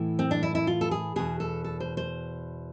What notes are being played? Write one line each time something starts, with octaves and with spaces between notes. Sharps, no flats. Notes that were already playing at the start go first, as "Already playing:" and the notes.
Already playing: A2 E3
C4
D4
E4
E4
F4
A4
G#4
E2 B2 G#4
A4
A4
C5
C5